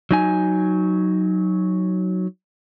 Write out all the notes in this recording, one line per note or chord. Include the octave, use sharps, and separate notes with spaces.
F#3 D#4 G#5